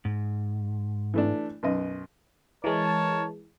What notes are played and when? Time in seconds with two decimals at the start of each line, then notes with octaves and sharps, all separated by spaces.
0.05 G#2
1.14 E3 A3 D4
1.63 B1 F#2 D#5
2.64 E3 G#3 A#4 C#5 A5